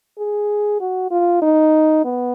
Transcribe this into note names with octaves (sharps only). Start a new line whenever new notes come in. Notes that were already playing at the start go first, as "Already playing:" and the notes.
G#4
F#4
F4
D#4
B3